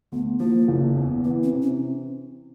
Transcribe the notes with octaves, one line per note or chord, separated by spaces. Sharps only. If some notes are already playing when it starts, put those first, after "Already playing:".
D2 B3
F3 A#3
F#1
E2
E3 B3
C4
C3
C#4